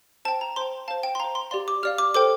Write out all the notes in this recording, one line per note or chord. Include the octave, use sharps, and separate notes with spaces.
C5 G5 A5
A#5
C5 G5 C6
C5 F5 A5
G5
C6
C5 F5 A#5
C6
G4 D5 F5 C6
D6
G4 D5 F5 F6
D6
A4 C5 G5 D6